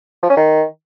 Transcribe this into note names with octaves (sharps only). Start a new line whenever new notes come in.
F3
C#4
D#3